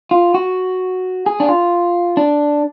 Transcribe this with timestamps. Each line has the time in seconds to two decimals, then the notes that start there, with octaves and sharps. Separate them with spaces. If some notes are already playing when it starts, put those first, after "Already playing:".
0.11 F4
0.34 F#4
1.26 G#4
1.40 D4
1.49 F4
2.17 D4